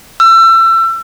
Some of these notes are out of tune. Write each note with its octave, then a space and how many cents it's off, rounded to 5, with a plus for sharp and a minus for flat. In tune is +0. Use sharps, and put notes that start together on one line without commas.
E6 +30